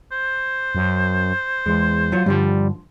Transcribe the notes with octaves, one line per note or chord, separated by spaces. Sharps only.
C5
F#2
E2 G#3
F#3 F4 C#5
G2 D3 F3 G3